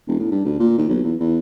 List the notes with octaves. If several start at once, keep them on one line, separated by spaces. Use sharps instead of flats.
E1
A2
G2
D2
A#2
D#2
B1
E2
E2